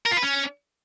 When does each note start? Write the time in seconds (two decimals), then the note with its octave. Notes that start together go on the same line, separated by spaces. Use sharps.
0.06 A#4
0.12 F4
0.17 B4
0.23 C#4